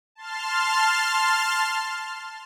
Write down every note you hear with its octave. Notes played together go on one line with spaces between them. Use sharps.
A5 C6 F6